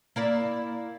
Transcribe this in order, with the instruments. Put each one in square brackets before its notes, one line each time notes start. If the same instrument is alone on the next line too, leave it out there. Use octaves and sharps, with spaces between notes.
[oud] A#3 E4 D5